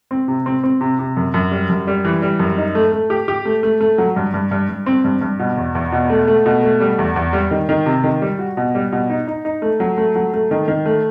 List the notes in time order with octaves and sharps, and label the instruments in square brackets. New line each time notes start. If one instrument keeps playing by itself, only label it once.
[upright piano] C4
C3
C4
C4
C3
C3
F#2
F#2
G3
F#2
G3
E3
G3
F#2
D#4
A3
A3
G4
G4
A3
A3
A3
F#3
G2
G2
G2
G2
C4
G2
G2
B2
E2
E2
B2
A3
A3
B2
A3
G3
E2
E2
G3
D#3
D#3
C3
D#3
G3
F#4
B2
G3
B2
D#4
D#4
D#4
A3
F#3
A3
F#3
A3
D#3
D#3
A3